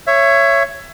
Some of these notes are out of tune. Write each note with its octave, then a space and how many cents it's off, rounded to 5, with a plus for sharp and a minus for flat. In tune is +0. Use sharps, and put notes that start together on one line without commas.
C#5 +0 E5 +25